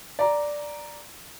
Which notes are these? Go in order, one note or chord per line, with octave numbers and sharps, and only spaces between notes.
D5 A#5